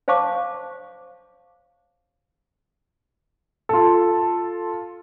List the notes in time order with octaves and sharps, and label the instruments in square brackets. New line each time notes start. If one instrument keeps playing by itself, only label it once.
[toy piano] C5 C#5 F5 A5 C#6 D6
[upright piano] F4 A4